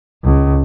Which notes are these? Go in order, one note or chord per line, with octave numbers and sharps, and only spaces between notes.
C#2